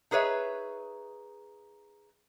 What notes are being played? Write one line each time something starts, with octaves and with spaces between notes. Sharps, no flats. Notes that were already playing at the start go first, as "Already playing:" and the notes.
D#4 G#4 B4 C#5 E5